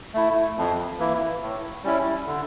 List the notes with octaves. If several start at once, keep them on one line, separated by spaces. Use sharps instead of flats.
A3 E4
F2
E3 A#3 E4
A2
G3 C#4 E4
D3